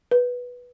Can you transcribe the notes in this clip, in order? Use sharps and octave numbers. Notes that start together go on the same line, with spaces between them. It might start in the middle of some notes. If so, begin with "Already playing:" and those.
B4